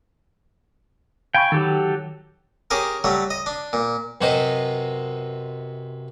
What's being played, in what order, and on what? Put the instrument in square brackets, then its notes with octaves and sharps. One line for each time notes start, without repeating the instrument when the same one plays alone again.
[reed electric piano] F5 B5 C#6 [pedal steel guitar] G5 G#5
[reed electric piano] D#3 [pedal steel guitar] F#3 G4 A4
[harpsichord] C#4 G4 G#4 A#4
F#3 G3 A3
D#5
D4
A#2
F#2 C3 B4 C5 D#5